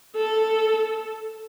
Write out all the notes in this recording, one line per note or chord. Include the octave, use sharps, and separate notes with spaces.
A4